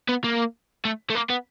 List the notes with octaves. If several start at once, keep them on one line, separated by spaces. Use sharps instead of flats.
B3
A#3
A3
A3
A#3
B3